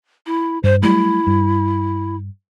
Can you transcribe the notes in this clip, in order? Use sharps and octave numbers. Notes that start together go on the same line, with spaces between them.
E4
G2 C5
F#3 G3 A3 E4
G2